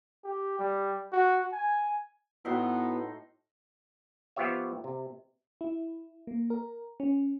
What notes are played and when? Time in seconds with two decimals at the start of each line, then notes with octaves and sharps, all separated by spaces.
0.24 G4
0.59 G3
1.13 F#4
1.53 G#5
2.45 A2 B3 D#4 E4 F#4 C6
4.36 F3 B3 F4 G4 C#5 E5
4.84 C3
5.61 E4
6.27 A#3
6.50 A#4
7.00 C#4